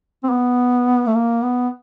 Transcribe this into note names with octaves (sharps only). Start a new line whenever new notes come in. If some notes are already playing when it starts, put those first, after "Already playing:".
C4
B3
A3
A#3
B3